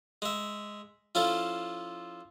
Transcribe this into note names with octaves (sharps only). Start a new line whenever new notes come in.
G#3 E5
F3 C#4 E4 F4 A4